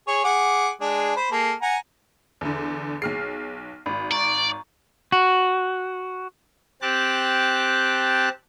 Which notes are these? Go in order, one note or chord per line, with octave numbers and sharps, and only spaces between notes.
G#4 C#5
G#4 F#5 D6
G#3 D4 G#4
C5 B5
A#3 G#4 A4
F#5 G#5 A#5
E2 D3
B1 G#4 F6 C7
G#1 F#4 B5
D5 A#5 C#6
F#4
C4 G4 A5 F#6